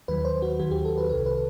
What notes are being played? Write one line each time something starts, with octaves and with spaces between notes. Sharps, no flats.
D#2 D#3 F#3 B4
C5
F#4
D#2 D#3 F#3 F#4
G4
A4
B4
C2 C3 D#3 A4
B4